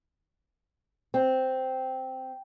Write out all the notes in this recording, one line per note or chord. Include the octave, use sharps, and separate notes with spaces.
C4